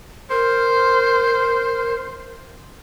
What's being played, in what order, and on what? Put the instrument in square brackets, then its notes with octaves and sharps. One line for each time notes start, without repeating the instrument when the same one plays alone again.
[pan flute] A#4 [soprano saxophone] C5